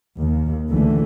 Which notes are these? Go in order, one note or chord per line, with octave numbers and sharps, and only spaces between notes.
D#2
C#2 D3 E3 A3